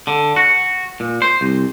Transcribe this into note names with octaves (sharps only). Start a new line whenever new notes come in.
D3
F#4
A#2
C5
C2